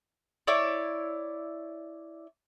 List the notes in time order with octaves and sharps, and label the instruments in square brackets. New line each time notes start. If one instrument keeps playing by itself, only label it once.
[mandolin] E4 C#5 D5